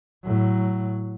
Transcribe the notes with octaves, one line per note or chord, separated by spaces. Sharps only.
A2 F#3